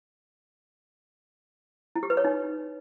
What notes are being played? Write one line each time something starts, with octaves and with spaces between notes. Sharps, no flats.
E4
G4
B4
C#5
D#4